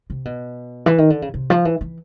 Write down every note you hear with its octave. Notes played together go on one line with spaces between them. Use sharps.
C3
B2
E3
D#3
D3
C#3
C3
F3
E3
E3